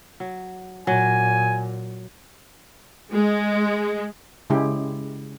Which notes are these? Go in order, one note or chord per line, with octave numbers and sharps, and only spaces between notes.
F#3
A#2 F#3 G#5
G#3
C#3 G#3 E4 G4